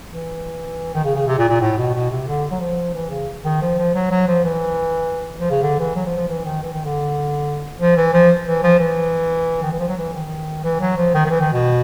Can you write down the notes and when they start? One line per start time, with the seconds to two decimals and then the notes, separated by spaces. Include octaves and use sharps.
0.10 E3
0.94 D#3
1.04 C#3
1.15 C#3
1.27 C3
1.38 A#2
1.49 A#2
1.61 A2
1.78 B2
1.94 B2
2.10 C3
2.27 D3
2.51 F#3
2.60 F3
2.94 E3
3.10 C#3
3.45 D#3
3.62 F3
3.78 F3
3.95 F#3
4.11 F#3
4.28 F3
4.44 E3
5.40 F3
5.50 C#3
5.62 D3
5.79 E3
5.96 F#3
6.06 F3
6.17 F3
6.29 E3
6.45 D#3
6.62 E3
6.73 D#3
6.85 D3
7.79 F3
7.96 E3
8.13 F3
8.46 E3
8.63 F3
8.79 E3
9.62 D#3
9.72 E3
9.79 F3
9.88 F#3
9.97 E3
10.13 D#3
10.64 E3
10.80 F#3
10.97 F3
11.14 D#3
11.26 D#3
11.30 E3
11.41 D#3
11.52 B2